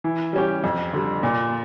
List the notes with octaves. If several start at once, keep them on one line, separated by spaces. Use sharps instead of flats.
E3
G3 C#4 G4
F2
D3 G3
A#2